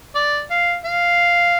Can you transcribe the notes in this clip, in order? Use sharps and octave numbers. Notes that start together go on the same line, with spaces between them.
D5
F5
F5